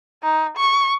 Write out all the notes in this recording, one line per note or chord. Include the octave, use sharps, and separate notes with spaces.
D#4
C#6